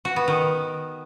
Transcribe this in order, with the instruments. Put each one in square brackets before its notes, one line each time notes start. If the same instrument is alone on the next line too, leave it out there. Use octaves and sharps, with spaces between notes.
[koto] F#4
B3
D#3